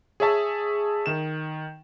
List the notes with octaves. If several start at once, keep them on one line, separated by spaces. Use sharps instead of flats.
G#4 C#5 E5 A5
D#3 E7